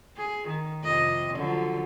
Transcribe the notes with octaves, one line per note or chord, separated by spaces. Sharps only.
G#4
D#3
F2 C3 D#5
D3 F3 F#3